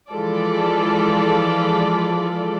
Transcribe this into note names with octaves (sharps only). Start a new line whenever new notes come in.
E3 F3 G#3 F4 A4 D5